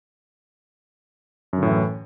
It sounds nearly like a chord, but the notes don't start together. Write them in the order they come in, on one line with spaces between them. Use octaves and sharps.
F#2 D3 A2 E3